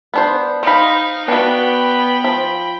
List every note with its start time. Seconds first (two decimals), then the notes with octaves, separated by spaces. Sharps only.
0.14 B3 D4 C5
0.63 D#4 C5 F5 B5
1.28 B3 D4 F#4 G5 B5
2.24 F3